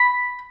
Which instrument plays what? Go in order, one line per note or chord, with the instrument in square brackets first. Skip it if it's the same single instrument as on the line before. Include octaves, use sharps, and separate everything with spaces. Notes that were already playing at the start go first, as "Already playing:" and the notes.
Already playing: [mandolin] B5